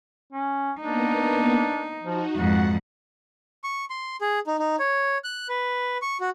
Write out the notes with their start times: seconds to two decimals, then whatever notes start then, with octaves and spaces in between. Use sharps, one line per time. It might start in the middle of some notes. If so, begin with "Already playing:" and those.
0.32 C#4
0.80 A#3 B3 D4 D#4
2.03 F3 D#4 F#4
2.36 F2 G#2 F#4 F#5
3.64 C#6
3.90 C6
4.21 G#4
4.47 D#4
4.59 D#4
4.79 C#5
5.24 F#6
5.49 B4
6.02 C#6
6.20 F#4